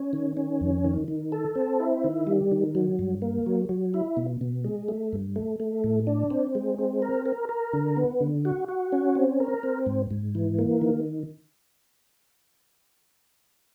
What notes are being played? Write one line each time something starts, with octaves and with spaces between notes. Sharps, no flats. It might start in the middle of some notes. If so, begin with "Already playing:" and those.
Already playing: C#4
D#3
C#4
F2
D#3
D#3
A4
C4
E4
D#3
G3
D#3
F#3
G2
A#3
F#3
F#3
E4
B2
B2
G#3
A3
G2
A3
A3
A2
D4
C4
G#3
C4
A#4
A#4
A#4
D3
B3
D3
F#4
F#4
C#4
C4
A#4
C4
G#2
G#2
E3
A#3
D#3